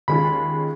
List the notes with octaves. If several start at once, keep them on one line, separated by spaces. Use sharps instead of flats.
D#2 D#3 G#3 C#4 F4 B5